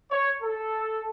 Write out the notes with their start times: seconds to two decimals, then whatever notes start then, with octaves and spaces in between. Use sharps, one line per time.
0.11 C#5
0.43 A4